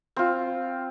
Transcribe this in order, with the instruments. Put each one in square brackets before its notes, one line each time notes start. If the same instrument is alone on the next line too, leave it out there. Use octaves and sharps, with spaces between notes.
[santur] C4 F4